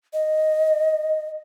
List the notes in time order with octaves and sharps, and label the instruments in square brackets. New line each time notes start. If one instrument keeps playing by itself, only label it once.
[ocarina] D#5